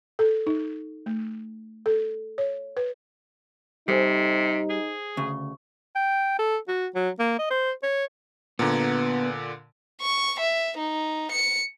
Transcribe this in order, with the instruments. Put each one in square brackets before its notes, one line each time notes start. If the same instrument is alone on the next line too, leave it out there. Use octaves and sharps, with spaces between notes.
[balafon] A4
D#4
A3
A4
C#5
B4
[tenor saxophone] C3 [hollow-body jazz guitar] G3 [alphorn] D#4 [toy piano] A4 C5 G#5
[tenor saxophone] G#4
[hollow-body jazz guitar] D2 C#3 [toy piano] C#6
[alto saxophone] G5
A4
F#4
F#3
A#3
D#5
C5
C#5
[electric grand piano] A#2 D3 [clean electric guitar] B3 A#5
[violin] C#6
E5
D#4
C#7